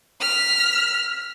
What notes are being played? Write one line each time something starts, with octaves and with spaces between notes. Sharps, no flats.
F6 B6